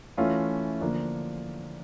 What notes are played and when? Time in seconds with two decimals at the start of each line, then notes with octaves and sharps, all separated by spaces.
0.18 E3 A3 C#4 F4
0.81 D3 F3 A#3 D4